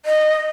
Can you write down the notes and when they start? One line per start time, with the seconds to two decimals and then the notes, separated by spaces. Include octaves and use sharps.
0.06 D#5